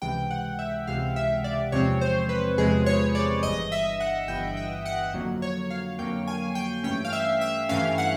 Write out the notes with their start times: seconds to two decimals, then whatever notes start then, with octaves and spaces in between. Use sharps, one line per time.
0.02 C#2 C3 E3 G#3 G5
0.31 F#5
0.59 E5
0.87 C#2 C3 E3 G#3 F5
1.16 E5
1.44 D5
1.72 E2 C3 F3 G#3 C4 C#5
2.01 C5
2.29 B4
2.57 E2 C3 F3 G#3 C4 G#4
2.86 C#5
3.15 D5
3.43 G1 G2 E3 D#5
3.72 E5
4.00 F#5
4.28 G1 G2 E3 G5
4.57 G5
4.86 F#5
5.14 F2 D3 F#3 A#3
5.42 C#5
5.70 F5
5.99 F2 D3 F#3 A#3 G5
6.28 G#5
6.55 G5
6.84 G2 E3 A3 C#4 G5
7.05 F5
7.13 E5
7.41 E5
7.69 G2 E3 A3 C#4 F5
7.98 F#5